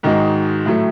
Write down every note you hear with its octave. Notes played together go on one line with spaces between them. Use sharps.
G#2 D#3 G#3 D#4 F#4
A2 F#3 A3